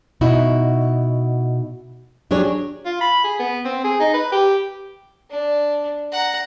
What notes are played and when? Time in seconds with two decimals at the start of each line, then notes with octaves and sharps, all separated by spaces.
0.21 B2 D#4 E4 F#4
2.31 F#3 D4 G4 G#4 C#5
2.86 F4
3.01 B5
3.24 G#4
3.39 B3
3.65 C4
3.84 G#4
4.00 D#4
4.14 B4
4.32 G4
5.30 D4
6.12 F#5 A#5